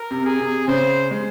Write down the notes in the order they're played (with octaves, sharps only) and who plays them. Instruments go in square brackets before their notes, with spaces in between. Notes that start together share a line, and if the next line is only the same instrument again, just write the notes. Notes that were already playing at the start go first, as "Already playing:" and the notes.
Already playing: [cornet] A#4
[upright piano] C3
[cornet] G#4
[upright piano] C3
[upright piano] C#3 [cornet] C5
[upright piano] G#3